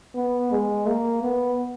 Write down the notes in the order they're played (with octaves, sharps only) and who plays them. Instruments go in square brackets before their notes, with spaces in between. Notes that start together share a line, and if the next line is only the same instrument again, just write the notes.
[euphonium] B3
G#3
A#3
B3